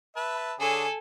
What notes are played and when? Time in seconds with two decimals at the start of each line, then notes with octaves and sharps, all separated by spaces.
0.16 B4 E5 A5
0.59 D3 G#4 A4 C#5 G#5